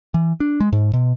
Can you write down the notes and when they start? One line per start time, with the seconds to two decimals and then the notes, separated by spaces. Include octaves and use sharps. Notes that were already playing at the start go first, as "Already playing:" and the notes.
0.14 E3
0.40 D4
0.60 G#3
0.72 G#2
0.93 B2